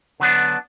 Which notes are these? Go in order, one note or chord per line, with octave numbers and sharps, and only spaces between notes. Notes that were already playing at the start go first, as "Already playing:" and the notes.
D3 F#3 B3 D4